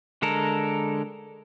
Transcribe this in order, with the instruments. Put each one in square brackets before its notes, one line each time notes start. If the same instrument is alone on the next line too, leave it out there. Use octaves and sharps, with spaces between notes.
[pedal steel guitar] D3 G#3 A4 A#4